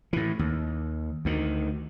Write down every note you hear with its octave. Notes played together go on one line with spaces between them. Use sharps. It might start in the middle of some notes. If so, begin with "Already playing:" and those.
A2 E3
D#2
D2 D#3